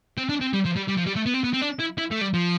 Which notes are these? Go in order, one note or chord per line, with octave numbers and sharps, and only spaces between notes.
C4
D4
C4
G3
F3
G3
G3
F3
G3
A3
B3
C4
B3
C4
D4
E4
E4
A3
G3
F3